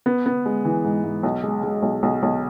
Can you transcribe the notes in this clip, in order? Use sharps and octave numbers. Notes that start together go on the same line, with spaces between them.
B3
B3
G#3
E3
G#2
G#2
B1
G#3
G#3
B1
B1
B1